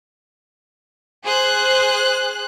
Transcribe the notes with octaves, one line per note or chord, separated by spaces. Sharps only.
G#4 C5 F#6